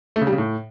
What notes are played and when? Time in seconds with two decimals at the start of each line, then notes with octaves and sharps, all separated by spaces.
0.16 A3
0.21 C#3
0.27 G3
0.33 C#3
0.38 A2